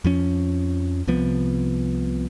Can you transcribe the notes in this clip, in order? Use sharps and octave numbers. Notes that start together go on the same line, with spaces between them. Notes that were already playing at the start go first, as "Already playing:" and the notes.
F2 F3 C#4
C2 C3 F3 B3